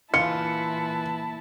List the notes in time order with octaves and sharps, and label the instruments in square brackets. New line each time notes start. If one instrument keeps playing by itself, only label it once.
[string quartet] A#2 E4 A5 [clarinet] E3 [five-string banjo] F4 [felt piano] C#7